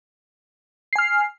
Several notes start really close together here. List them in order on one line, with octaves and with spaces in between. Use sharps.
C7 G#5 F6